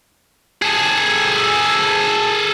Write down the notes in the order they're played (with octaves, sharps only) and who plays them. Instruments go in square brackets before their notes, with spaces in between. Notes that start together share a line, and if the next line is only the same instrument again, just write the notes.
[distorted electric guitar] G#4 A4